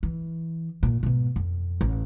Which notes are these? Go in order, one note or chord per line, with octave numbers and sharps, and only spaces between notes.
E3
A#2
G#2 B2
F2
A1